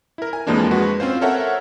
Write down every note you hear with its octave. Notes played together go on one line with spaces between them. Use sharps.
E4 A#4
G#5
F2 E3 F3 G#3 A#3 D4
G#3 F#4 B4
C4 C#4 F4 C5
A4 A#4 C#5 E5 F#5